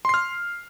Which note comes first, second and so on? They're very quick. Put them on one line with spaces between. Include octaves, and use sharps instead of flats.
C6 C7 F6